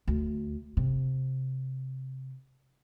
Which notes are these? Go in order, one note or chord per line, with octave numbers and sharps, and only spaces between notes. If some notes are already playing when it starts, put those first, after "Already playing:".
D2
C3